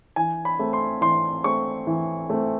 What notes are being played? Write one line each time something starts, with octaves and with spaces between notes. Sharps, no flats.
E3 G#5
B5
A3 C4
C6
E3 C6
A3 C4 C#6
E3
A3 C4